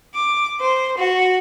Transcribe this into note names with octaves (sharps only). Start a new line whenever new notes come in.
D6
C5
F#4